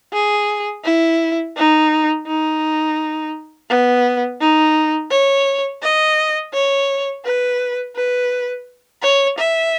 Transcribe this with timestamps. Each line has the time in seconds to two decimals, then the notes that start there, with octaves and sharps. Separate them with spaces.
0.13 G#4
0.84 E4
1.56 D#4
2.26 D#4
3.69 B3
4.40 D#4
5.11 C#5
5.82 D#5
6.53 C#5
7.25 B4
7.96 B4
9.02 C#5
9.38 E5